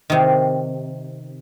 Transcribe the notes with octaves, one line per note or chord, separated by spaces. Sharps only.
C3 D#3